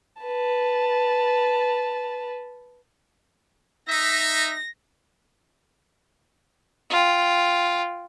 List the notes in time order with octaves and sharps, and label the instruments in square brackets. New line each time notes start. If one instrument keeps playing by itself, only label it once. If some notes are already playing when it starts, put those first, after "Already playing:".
[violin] B4 A5
[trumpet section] D#4 E5 [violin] A#6
[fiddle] F4 G5